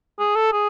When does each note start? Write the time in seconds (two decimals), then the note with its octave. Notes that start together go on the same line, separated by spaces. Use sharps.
0.19 G#4
0.36 A4
0.53 G#4